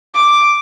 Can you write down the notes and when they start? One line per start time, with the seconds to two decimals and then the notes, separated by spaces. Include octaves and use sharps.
0.14 D6